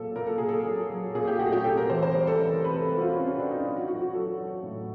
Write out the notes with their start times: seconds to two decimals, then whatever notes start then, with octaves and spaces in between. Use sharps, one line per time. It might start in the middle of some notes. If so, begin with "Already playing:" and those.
Already playing: A#2 F#3 A4
0.16 A#2 A#4
0.27 A4
0.38 A#2 G#4
0.49 A4
0.65 F#3
0.90 F#3
1.15 A#2 G#4
1.28 G4
1.39 A3 F#4
1.53 G4
1.64 C3 A4
1.77 A#4
1.90 E3 C5
2.03 C5
2.14 G3
2.27 A4
2.39 E3
2.52 A#4
2.64 C3 B4
2.77 A4
2.89 G3
2.97 F#4
3.02 F4
3.14 C3 C#4
3.26 C4
3.39 C3 D4
3.51 D#4
3.63 F#3
3.76 F#4
3.88 F#3 F#4
4.01 F#4
4.13 F#3 A4
4.38 F#3
4.63 A2